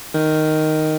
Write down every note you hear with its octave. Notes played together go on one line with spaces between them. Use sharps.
D#3